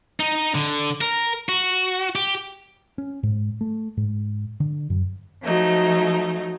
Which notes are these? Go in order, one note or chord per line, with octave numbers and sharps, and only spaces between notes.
D#4
D3
A#4
F#4
G4
C#4
G#2
A3
G#2
D3
F#2
F3 F#3 A3 D#4